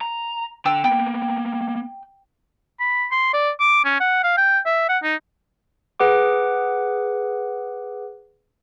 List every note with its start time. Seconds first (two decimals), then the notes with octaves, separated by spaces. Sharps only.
0.01 A#5
0.65 D3 G5 A5 E6
0.84 A#3 B3 G5
2.80 B5
3.12 C6
3.34 D5
3.60 D6
3.85 C#4
4.01 F#5
4.24 F5
4.38 G5
4.66 E5
4.89 F#5
5.04 D#4
6.00 G#4 B4 F#5 D6